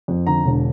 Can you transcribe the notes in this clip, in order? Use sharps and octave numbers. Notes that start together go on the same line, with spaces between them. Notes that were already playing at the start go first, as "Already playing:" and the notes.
F2
D3 A#5
E1